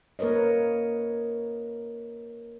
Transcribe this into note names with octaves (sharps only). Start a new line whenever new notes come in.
A#3 A#4 B4 C#5 D#5